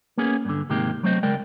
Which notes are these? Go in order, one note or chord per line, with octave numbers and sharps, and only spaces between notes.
A#3 B3 C#4 G#4
G2 D3
G#2 C3 D#3 G#3 A#3 G4
F#3 A3 C4 C5 D#5
C#2 G#3 A#4 D5 G5